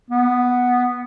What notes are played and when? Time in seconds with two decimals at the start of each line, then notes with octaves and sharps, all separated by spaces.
0.10 B3